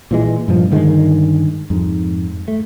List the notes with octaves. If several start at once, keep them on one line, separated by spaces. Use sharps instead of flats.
A#2 E3 G#3
G2 A#2 F3
G2 D3 D#3 G#3
F2 G#2
A3